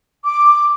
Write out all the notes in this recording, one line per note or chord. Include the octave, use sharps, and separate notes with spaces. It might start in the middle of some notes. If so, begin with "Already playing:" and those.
D6